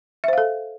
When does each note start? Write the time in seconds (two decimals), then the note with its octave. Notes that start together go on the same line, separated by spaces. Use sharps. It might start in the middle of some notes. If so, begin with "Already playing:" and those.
0.24 E5
0.28 C5
0.33 F5
0.38 A4